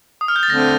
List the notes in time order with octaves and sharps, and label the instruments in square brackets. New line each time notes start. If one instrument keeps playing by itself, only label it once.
[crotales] D#6
F6
G6
A6
[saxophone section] D3 A3 C4 [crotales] A#6